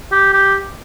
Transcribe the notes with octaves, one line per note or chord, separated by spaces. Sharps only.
G4
G4